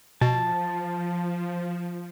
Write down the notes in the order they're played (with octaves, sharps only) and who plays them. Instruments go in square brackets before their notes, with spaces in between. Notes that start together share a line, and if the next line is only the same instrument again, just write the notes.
[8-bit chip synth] B2 [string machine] F3 [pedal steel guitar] A5